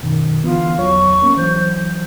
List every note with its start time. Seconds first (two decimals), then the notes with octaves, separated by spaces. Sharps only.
0.02 F#2 B2 D#3
0.44 D3 E3 B3 F4
0.78 E2 F#3 C#5 C#6
1.22 A#3 B3 C#4
1.36 E3 F#3 C5